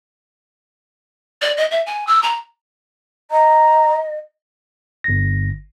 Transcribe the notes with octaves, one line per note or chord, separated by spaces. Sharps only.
D5
D#5
E5
G#5
E6
A#5
D#5 A#5
G1 A#6